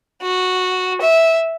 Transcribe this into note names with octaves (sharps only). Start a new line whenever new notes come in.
F#4
E5